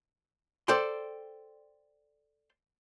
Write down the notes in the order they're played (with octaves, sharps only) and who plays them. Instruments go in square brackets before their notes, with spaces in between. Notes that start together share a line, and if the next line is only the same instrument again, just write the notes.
[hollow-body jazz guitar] A4 C5 D5 G5 C6